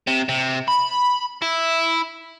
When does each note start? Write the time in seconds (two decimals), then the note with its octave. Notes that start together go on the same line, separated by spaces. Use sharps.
0.07 C3
0.29 C3
0.68 B5
1.42 E4